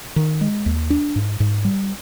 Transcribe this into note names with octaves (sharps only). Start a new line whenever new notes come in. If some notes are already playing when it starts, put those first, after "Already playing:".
D#3
G#3
D#2
D4
G#2
G#2
G3